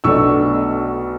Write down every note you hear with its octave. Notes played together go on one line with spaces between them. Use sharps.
B1 B2 A3 D4 C#6 E6